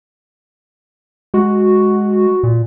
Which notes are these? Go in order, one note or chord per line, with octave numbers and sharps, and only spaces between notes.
G#3 F#4
A#2